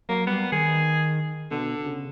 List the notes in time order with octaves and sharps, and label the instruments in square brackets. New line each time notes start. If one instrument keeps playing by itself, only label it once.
[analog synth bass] F#3 [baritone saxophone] A#3
[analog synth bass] G3 [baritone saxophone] B3
[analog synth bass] D#3 [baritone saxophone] G#4
[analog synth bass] B2 [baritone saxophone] D3
[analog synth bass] C#3